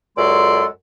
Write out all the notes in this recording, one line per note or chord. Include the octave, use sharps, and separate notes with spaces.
C#2 F#2 G#3 A4 D5 C6